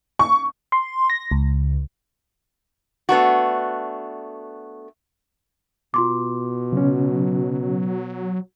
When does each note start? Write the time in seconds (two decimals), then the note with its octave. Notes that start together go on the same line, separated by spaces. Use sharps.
0.19 C#6
0.72 C6
1.10 A#6
1.31 C#2
3.09 A3 B3 D4 F#4
5.94 B2 F4 C6 D6
6.72 C#3 F#3 C#4